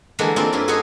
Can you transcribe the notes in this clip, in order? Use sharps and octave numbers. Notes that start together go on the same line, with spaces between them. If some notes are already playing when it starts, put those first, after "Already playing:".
D3 E3 G3 G#3 A#3 D4
A#3 C4 D4 F4 D5
G2 C#4 E4 F4
F#4 G#4 A4 C5 C#5 D#5